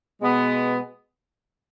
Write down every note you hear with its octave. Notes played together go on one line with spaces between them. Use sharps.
B2 G#3 B3